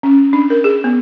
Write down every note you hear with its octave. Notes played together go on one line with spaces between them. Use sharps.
C#4
D4
A#4
G#4
B3